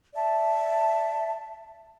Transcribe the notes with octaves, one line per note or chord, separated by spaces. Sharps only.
D5 E5 A5